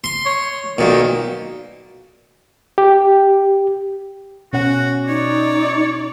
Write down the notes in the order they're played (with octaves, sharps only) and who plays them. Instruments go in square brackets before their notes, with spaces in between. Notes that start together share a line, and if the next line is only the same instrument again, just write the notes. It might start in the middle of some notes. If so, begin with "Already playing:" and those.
[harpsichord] C6
[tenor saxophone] C#5
[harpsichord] B1 A#2 [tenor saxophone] D#3
[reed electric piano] G4
[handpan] B2 C#4 F#5 [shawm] F#4
[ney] D#4 [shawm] C#5 [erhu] D5